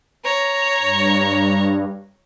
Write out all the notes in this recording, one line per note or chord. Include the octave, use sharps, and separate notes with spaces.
C#5 A#5
G2